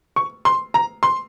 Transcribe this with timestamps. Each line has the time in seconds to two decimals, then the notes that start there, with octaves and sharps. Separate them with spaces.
0.16 C#6
0.45 C6
0.74 A#5
1.03 C6